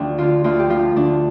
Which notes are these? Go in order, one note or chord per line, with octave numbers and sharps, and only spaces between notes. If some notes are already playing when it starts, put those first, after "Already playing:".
Already playing: D2 F3 D4 G4
D3 F4
D2 F4
G4
F3 F4
D2 D4